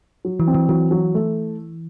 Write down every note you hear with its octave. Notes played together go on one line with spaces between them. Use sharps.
F#3
E3
C4
E3
E3 F#3
F#3
A3